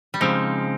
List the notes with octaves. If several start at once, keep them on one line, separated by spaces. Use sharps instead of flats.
G3
C#3 F3 G#3 C4 D#4